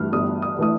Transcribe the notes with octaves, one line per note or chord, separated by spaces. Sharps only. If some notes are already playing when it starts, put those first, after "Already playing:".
Already playing: G2 E3 A3 F6
G1 D#6
D#6
E3 A3 D#6